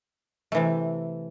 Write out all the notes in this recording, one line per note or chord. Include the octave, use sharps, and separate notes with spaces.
C3 E3 A3